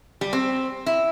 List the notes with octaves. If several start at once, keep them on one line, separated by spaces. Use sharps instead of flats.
G3
C4
E4